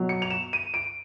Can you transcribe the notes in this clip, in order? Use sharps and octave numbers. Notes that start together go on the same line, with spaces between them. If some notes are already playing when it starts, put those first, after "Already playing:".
Already playing: B2 F#3
C#7
F7
E7
D#7
D7